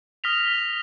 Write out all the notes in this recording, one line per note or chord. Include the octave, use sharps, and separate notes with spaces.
D#6 F6 A#6 B6 F7